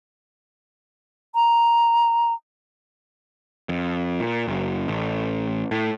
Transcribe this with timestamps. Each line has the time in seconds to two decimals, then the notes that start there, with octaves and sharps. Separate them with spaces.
1.35 A#5
3.69 F2
4.20 A#2
4.47 F#1
4.88 A1
5.71 A2